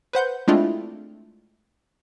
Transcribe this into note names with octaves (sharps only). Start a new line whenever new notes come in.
B4 C5 F#5 G6
G#3 A3 C4 D4 E4 F4